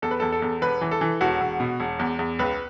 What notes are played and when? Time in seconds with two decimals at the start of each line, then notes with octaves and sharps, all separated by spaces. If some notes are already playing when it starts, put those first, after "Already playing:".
0.02 E2 A4
0.11 B4
0.20 E2 A4
0.32 A4
0.42 E2
0.62 E1 B4
0.81 E3
0.91 A4
1.01 E3
1.21 E1 F#4
1.41 E1
1.60 B2
1.80 E1
1.99 E2
2.19 E2
2.39 C#2 B4